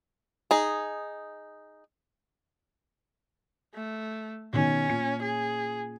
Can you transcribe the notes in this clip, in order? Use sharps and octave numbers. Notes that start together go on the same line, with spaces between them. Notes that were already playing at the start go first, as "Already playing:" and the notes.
D#4 G#4
A3
B2 D#3 C#4
A#2 C#7
G#4